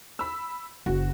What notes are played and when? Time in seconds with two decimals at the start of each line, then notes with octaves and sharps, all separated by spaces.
0.19 B5 E6
0.86 F#1 F#4